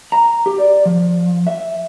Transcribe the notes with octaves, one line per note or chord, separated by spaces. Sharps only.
A#5
G4
D5
F3
E5